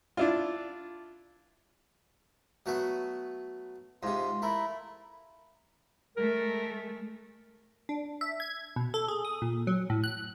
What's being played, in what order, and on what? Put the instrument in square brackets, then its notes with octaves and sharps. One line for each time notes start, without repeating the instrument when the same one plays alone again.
[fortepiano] D4 E4 F4
[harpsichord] F#3 A3 B3
[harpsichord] G#2 C3 [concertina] F4
[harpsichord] A3 [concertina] E4 A#4
[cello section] G#3 A3 [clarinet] A#4
[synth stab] D4
E5
G#6
B2
A4
G#4
D#6
A#2
F#3
A2
F#6